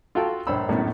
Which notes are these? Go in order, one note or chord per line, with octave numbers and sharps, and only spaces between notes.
F4 F#4 A4 F5 G5 A5
A#1 G2 C5 C#5 B5 E6
A#1 F#2 A2 B3